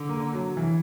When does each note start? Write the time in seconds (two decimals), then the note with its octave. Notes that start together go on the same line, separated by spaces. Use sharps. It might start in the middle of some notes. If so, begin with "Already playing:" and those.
Already playing: D3
0.09 A#3
0.33 F#3
0.57 E3